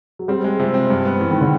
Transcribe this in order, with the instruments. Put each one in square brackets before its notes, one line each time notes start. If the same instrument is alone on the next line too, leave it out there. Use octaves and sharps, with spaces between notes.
[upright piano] F#3
[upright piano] G3 [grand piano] C4
[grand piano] G#3
[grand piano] C3 [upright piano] F3
[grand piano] C4
G2
B3
[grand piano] G2 [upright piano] E3
[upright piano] D#3
D3